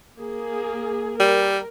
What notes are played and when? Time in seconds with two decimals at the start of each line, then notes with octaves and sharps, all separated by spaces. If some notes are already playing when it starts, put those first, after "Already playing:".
0.19 A#3 G#4
1.20 G3 A#4